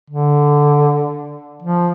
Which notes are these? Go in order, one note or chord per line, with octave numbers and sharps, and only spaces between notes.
D3
F3